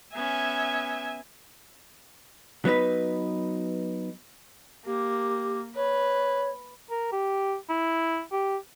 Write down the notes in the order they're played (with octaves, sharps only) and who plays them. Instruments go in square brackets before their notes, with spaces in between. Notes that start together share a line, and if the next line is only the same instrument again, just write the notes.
[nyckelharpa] B3 C#4 [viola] E5 G#5
[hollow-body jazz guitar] F#3 B3 D#4 B4
[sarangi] A#3 [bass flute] G4
[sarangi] B4 [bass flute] C#5
[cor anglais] A#4
G4
E4
G4